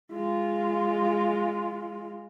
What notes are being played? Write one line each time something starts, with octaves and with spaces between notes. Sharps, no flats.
G#3 F4